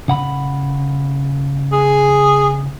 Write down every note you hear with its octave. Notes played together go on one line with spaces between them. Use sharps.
C#3 F#5 B5
G#4